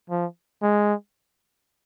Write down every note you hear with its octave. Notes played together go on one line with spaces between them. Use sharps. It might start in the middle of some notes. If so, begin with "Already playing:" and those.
F3
G#3